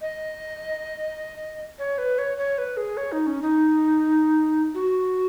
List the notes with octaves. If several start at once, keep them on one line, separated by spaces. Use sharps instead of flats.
D#5
C#5
B4
C#5
C#5
B4
G#4
C#5
D#4
C#4
D#4
F#4